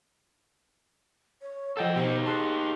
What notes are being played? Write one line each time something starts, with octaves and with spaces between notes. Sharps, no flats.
C#5
F3 A4 D#5 F#5 G5 E6
B2 D#4 G4 C5
G#4 A5 C6 F#6